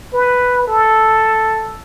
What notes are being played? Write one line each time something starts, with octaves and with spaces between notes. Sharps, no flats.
B4
A4